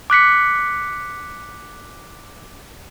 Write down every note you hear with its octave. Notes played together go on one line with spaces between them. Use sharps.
D6 F#6 B6 C#7